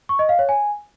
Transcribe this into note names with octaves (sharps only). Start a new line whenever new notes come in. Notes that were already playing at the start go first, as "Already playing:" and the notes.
C#6
D#5
F5
C#5
G#5